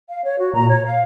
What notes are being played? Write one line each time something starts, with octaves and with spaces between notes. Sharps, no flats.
F5
C#5
F#4
A#2 A#5
C#5
F5